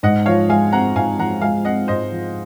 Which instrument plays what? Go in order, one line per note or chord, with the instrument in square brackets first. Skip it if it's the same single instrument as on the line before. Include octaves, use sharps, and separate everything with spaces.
[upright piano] G#2 [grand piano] D#5 F#5
[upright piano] F3 [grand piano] C#5 F5
[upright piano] G#3 [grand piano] F5 G#5
[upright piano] C4 [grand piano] F#5 A#5
[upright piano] G#2 [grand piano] F5 G#5
[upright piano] F3 [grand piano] F#5 A#5
[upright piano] G#3 [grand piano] F5 G#5
[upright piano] C4 [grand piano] D#5 F#5
[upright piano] G#2 [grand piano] C5 D#5
[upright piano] F3